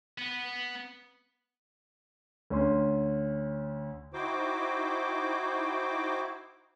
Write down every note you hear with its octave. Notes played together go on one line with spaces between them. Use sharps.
B3
D2 C#4 C6
D#4 E4 F#4 C5 G5 D6